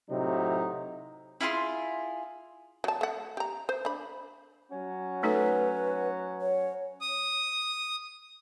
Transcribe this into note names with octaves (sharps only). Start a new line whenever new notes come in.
A2 C3 F#3 D#4
E4 F4 G#4 C6
F#3 A5
A3 F#5
G4 A#5
C5
D4 B5
F#3 C#4 F#4
A3 D#4 A4 B4
C#5
D#6